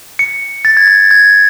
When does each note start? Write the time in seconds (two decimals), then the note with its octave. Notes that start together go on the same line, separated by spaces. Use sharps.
0.19 C#7
0.65 A6
0.77 G#6
0.87 A6
1.11 G#6